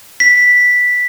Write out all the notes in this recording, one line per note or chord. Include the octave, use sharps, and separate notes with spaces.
B6